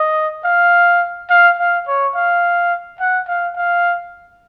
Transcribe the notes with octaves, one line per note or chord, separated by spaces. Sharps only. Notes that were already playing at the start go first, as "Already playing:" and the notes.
Already playing: D#5
F5
F5
F5
C#5
F5
F#5
F5
F5